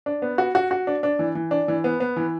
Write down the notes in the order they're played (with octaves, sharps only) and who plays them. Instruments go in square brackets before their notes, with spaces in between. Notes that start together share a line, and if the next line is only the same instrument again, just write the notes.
[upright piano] D4
B3
F#4
F#4
F#4
D4
D4
E3
E3
D4
E3
B3
B3
E3